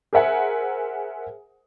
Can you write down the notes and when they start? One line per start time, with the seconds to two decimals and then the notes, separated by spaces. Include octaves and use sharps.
0.13 G#4 A#4 C5 E5 F#5 G#5